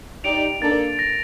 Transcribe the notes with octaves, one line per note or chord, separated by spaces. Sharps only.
D#4 G4 D5 D7 F7
A#3 D4 A4 D5 A6
A#6